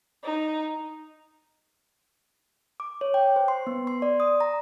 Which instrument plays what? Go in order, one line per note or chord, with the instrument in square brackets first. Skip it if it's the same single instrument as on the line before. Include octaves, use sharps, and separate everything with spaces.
[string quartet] D#4
[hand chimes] D6
C#5
G5
C5
C6
B3
C6
D5
D#6
A#5